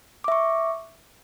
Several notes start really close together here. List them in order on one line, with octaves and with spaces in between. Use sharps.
D6 E5 C#6